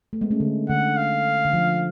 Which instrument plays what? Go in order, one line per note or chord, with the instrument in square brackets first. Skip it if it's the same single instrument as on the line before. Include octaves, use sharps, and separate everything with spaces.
[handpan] A3
G#3 B3
A3 C#4
D3
[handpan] D3 [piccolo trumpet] F#5
[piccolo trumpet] F5
[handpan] D3
F3